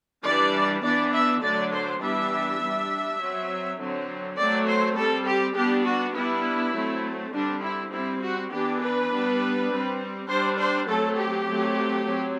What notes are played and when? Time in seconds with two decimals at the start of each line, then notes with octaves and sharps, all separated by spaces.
0.24 E3 G3 D4 D5
0.83 E3 B3 D4 D5
1.13 E5
1.42 D3 F#3 A3 D4 D5
1.72 C5
2.01 E3 G3 B3 D4 E5
2.61 G3 D4
3.19 F#3 C4
3.79 D3 F#3 C4
4.37 F#3 A3 C4 D5
4.67 C5
4.96 G3 C4 A4
5.26 G4
5.55 G3 B3 D4 G4
5.85 F#4
6.15 G3 B3 D4 E4
6.73 F#3 A3 C4
7.34 D3 G3 C4 D4
7.62 E4
7.92 G3 C4 E4
8.22 F#4
8.51 E3 B3 D4 G4
8.81 B4
9.10 G3 B3 D4
9.70 G3 C4
10.29 G3 D4 C5
10.59 C5
10.87 F#3 A3 C4 A4
11.17 G4
11.47 F#3 A3 C4
12.06 F#3 C4